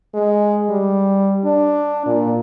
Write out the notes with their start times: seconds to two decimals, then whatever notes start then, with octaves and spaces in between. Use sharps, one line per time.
0.14 G#3
0.70 G3
1.45 D4
2.06 A#2